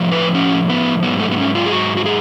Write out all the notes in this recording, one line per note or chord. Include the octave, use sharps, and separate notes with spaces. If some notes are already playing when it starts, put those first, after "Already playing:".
Already playing: A2 F3
B4
C#4
B3
G#2 F#3 B3
A3
B3
C#4
F4
G#4
F#4
F#4
G#4